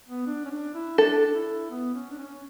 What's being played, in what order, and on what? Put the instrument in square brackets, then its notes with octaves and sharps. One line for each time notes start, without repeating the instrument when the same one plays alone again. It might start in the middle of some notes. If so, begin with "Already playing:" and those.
[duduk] B3
D4
C#4
D4
E4
[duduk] D4 [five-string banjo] A4
[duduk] D4
E4
B3
C#4
D4
C#4